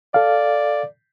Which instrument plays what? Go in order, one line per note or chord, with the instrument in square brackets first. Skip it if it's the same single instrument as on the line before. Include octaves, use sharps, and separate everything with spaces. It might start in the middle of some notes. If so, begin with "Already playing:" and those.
[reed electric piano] A4 F5 [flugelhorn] D5